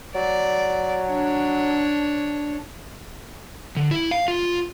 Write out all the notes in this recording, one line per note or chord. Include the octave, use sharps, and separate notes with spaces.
F#3 D5
D4 C#5
D3
E4
F5
F4